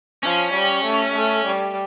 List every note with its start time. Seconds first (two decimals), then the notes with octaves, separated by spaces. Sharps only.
0.23 F3 C#4
0.54 G3
0.85 A3
1.15 A3
1.46 G3